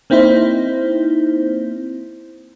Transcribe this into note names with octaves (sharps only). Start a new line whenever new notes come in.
A#3 C4 D#4 E4 C5